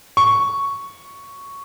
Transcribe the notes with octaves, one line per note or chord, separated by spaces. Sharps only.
C#6